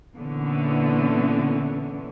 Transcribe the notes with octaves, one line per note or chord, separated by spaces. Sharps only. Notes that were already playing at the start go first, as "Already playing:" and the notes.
A#2 D3 E3 B3 C#4